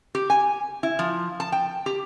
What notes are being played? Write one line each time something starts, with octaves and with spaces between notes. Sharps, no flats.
G4
G#5
E4
F3
A5
G5
G4